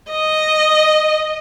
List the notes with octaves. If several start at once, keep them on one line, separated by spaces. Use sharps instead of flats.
D#5